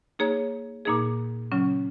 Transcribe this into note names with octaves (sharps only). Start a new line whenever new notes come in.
A#3 D#4 G#4 C#5
A#2 A#3 D#4 G#4
C#3 F#3 C#4